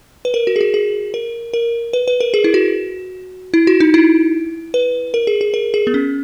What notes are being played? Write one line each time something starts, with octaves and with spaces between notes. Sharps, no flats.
B4
A#4
F#4
G#4
F#4
G#4
A#4
A#4
B4
B4
A#4
G#4
E4
F#4
E4
F#4
D#4
E4
B4
A#4
G#4
G#4
A#4
G#4
B3
C#4